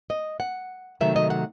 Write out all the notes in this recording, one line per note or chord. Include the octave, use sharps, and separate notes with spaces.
D#5
F#5
C3 D#3 F#3 A3 E5
D#5
F#5